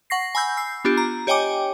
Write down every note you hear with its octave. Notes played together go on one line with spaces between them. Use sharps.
F#5 C#6 A#6 C7
G#5 B5 E6 G6
E6 C7
B3 D4 F4 G4
A#5
G4 C#5 D#5 G5 G#5 D6